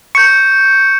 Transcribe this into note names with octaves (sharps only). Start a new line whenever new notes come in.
C#6 G6 C#7